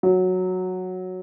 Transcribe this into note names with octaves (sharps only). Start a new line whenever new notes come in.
F#3